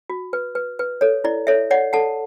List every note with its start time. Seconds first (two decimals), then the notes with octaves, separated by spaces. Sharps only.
0.09 F#4
0.33 B4
0.55 B4
0.79 B4
1.01 A4 C#5
1.24 E4 D5
1.47 A4 C#5 E5
1.71 C#5 D5 F#5
1.93 A4 F#5 A5